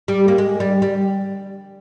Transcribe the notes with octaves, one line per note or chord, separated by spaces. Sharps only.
G3
A#3
G#3
G3
G3